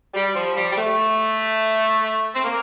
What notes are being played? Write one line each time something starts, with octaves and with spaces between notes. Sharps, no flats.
G3
F3
G3
G3
A3
C4
A#3